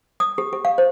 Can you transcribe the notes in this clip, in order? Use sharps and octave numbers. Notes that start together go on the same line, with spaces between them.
D#6
G4
G4
F5
C5